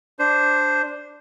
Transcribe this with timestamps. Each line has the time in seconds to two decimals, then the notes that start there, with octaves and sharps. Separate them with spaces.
0.19 D4 C5